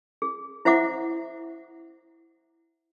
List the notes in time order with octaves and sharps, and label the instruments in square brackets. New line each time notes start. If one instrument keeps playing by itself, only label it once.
[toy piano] G#4
E4 C5 E5 F#5 D6